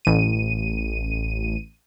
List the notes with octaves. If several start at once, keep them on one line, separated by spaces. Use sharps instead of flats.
A1 D#7